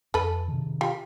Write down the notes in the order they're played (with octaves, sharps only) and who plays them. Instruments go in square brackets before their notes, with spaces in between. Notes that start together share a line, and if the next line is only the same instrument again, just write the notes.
[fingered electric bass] F2 [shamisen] A4 B4
[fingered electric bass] C3 D#3
[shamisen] F4 G4